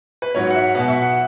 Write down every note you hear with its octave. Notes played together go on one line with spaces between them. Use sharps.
B4
G#2 F#3 C#4 C#5
F#5
E5
B2 B3 F#5
E5
F#5